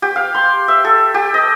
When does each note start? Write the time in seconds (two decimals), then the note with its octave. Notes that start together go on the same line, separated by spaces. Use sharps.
0.02 G4
0.16 F5
0.35 C6
0.68 E5
0.85 A4
1.14 G4
1.34 D#5